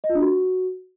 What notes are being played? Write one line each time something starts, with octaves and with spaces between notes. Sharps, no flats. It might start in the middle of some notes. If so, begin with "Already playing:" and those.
D#5
F4
D4
F#4